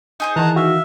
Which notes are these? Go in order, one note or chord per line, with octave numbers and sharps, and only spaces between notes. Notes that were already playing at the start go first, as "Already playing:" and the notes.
D#4 G#4 C5
D#3 E3 A5 A#5 F#6
F#4 E5 F5